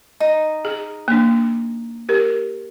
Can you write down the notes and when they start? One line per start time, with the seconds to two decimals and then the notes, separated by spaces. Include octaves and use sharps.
0.20 D#4
0.65 G#4
1.08 A#3 D4
2.09 G4 A#4